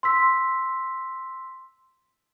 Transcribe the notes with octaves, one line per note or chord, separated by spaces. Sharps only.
C6 E6 B6